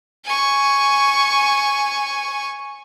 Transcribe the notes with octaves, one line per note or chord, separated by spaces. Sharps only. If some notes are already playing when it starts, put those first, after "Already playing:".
G#5 C#6